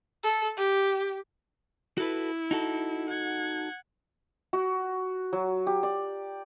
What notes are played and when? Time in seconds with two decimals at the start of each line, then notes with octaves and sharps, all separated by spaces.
0.24 A4
0.57 G4
1.98 E4 F#4 A4 B4
2.51 D#4 F#4 A4
3.09 F#5 G#6
4.53 F#4
5.33 F#3
5.67 G4
5.83 D5